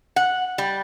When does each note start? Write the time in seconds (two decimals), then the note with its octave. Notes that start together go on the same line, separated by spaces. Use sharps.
0.16 F#5
0.58 G3